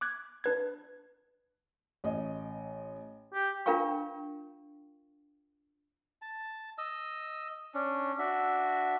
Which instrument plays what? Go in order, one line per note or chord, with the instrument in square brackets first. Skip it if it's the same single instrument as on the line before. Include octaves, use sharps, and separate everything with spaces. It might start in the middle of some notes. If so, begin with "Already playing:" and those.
[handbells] D6 F#6 G#6
D4 B4 G#6
[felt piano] A1 D#5
[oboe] G4
[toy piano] D4 F4 A#4 F5 G5 C#6
[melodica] A5
D#5 E6
C#4 D4
D4 F#4 E5